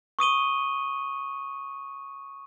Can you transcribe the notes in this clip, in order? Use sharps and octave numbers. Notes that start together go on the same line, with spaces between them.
C#6 D#6 D#7 G7